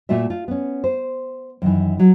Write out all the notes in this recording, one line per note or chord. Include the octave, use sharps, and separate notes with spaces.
A#2 A3 F4 F#4 E5
F4
B3 C#4
C5
F#2 D#3 E3
F#3